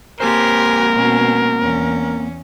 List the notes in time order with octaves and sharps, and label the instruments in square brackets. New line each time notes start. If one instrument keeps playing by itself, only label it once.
[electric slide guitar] A#3 C4 C5 [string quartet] G4 G#5 C6 [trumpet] A#4
[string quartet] B2 C#4
E2 C#4